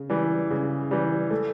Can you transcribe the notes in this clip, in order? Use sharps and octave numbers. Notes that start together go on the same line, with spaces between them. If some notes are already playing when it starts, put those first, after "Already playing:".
Already playing: C#3
E3 G3
C#3
E3 G3
A3